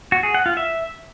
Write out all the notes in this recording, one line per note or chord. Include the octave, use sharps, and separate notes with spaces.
F#4
G#4
F#5
F4
E5